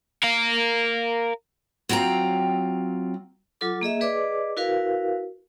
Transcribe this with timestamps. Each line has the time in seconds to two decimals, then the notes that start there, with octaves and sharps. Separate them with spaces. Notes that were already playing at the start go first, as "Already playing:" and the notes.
0.23 A#4 F5
1.89 F#3 C4 F4 G5 A#5
3.61 F#3 F4 A4 D6
3.81 A#3 G#4 D#5 E5
4.01 G#4 B4 D5 D#5 D6
4.57 E4 F#4 A#4 B4 F5